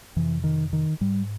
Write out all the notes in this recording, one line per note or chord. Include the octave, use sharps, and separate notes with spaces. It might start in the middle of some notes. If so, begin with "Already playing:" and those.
F2 C3 E3
D#3
D#3
G#2 G3